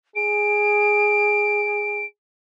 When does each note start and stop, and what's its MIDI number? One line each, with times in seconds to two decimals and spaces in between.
0.15 2.04 68
0.15 2.05 98